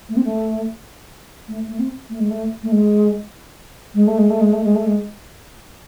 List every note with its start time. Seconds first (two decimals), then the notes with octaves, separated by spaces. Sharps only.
0.09 A3
0.17 C4
0.24 A3
1.48 A3
1.68 A3
1.79 C4
2.10 A3
2.20 G#3
2.30 A3
2.63 A3
2.72 G#3
3.95 G#3
4.07 A3
4.18 G#3
4.30 A3
4.41 G#3
4.53 A3
4.64 G#3
4.75 A3
4.86 G#3